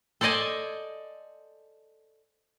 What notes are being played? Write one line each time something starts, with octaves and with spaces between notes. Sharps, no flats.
A4 C5 D5 D#5 G#5